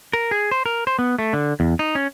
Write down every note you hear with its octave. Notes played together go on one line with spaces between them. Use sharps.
A#4
G#4
C5
A#4
C5
B3
A3
D3
E2
D#4
C#4